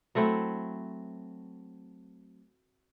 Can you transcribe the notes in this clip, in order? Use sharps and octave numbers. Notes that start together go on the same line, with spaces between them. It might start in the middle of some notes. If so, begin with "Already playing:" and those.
F#3 A3 C4 E4